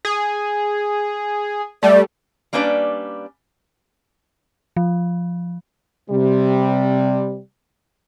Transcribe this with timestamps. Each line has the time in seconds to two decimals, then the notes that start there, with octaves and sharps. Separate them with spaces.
0.05 G#4
1.83 G3 A3 D5
2.53 G3 A#3 C#4 D4 B4 D5
4.77 F3
6.10 C3 G3